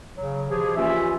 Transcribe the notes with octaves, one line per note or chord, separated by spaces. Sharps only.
C#3 F#3
B2 E3 F3 G4 G#4
E3 A#3 C#4 F4 G4 E5